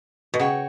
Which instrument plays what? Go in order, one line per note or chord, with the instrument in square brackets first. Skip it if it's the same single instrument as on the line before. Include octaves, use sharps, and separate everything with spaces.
[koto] B2
[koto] C#3 [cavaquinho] F#4 C#5 G5 C#6